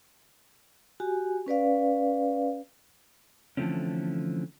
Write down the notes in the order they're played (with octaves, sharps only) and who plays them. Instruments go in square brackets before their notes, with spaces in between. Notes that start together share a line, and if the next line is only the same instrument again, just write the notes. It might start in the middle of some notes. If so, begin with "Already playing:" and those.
[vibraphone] F#4 G4 G#5
C#4 B4 D5 F5
[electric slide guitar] D3 E3 F3 A3 C4 C#4